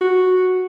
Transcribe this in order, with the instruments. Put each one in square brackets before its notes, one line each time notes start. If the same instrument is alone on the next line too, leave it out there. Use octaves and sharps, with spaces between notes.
[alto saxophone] F#4